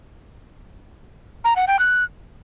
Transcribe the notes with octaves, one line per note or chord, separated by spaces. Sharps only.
A#5
F#5
G5
F#6